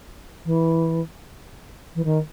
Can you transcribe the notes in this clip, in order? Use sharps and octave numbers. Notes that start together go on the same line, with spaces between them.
E3
E3
D#3